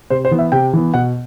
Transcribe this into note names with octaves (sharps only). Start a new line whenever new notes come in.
C3 C5
C5
E3 B3
E5
C3 G5
E3 B3
B2 F#5